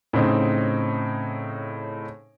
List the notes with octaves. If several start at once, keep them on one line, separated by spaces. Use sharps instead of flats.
A2 C#3 C4 D#4